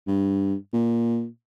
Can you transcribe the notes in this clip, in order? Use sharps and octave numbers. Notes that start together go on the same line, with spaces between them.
G2
A#2